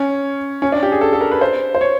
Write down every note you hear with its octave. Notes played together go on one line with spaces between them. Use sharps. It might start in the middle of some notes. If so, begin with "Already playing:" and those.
Already playing: C#4
C#4
D4
G4
G#4
A4
A4
A#4
B4
C5
C5
C#5